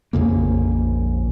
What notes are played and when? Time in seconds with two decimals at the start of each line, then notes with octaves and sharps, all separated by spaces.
0.13 A#1 F2 C#3 A#3